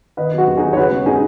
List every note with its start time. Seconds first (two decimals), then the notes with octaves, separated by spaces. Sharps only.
0.17 D#3 B4 D#5
0.33 F#3 F#4 B4
0.47 D#2
0.57 D#2 D#4 G#4
0.73 C#5
0.76 C#3 F#4 B4
0.92 G#3
1.06 D#4 G#4